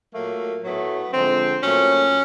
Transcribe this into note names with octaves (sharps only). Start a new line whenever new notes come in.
A#2 F#3 A3 A#3
A2 F#3 A3 B3
D3 F3 G#3 C4
A#2 F#3 A3 C#4